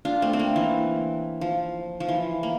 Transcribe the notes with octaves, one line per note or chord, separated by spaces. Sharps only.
D4 F4
A3 C4
C4
A#3
E3
F3
F3
E3
A#3